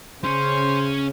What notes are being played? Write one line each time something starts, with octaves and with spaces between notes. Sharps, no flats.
C#3 C#4 C5 C#5